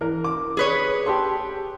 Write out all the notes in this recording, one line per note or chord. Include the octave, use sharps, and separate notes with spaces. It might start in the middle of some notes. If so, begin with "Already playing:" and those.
E3 A#4
D6
G#4 B4 C#5
G4 A4 C6